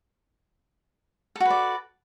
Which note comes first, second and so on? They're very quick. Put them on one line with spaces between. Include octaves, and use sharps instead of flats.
A4 F#4 B4 D5